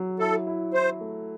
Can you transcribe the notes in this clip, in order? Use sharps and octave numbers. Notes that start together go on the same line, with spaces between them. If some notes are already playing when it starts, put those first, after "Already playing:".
Already playing: F#3
E4 A4
E4
E4 C5
A3